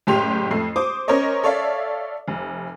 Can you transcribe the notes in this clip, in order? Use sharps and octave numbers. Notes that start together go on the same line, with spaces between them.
F#1 A2 G4 C6 F7
F2 A3 C7
C5 D6 D#6
C#4 A#4 C5 C#5 D#5
A4 C#5 D5 E5 F5
F1